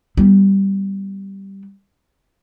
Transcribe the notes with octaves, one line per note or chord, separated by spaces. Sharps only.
G3 B3